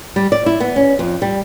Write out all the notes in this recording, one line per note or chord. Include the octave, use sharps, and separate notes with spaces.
G3
D5
E4
B3
C#4
F2
G3